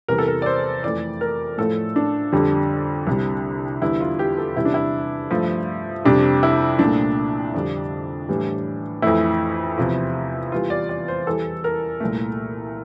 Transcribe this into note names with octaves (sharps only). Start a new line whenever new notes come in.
E2 C3 E3 G3 A#4
A4
A#4
D5
C5
F2 E3 A3 D5
A#4
A2 F3 A3 A4
D4
F2 D3 G3
C2 C3 G3
E2 D3 G3 E4
F4
G4
A4
E2 C3 G3 E4
D4
E4
G2 F3 A3
F2 C3 G3 D4
E4
C2 A#2 A3 D4
F2 D3 G3
A2 E3 G3
F2 E3 A3 E4
E2 C3 F3
E2 E3 G3 F4
D5
D5
C5
E2 E3 G3 A4
A#4
C2 A#2 A3